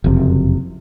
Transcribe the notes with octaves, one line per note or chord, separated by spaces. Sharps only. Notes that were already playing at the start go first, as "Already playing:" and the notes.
F#1 F2 C3